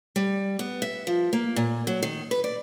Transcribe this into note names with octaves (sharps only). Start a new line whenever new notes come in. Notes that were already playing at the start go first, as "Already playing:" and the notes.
G3
B3
E5
F3
A#3
A#2
F#3
D#3
B4
D5